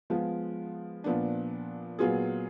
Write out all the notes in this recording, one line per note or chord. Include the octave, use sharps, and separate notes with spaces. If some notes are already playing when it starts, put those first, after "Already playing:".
F3 G#3 B3 F4
A#2 F3 B3 D4
A#2 F#3 B3 F4 G#4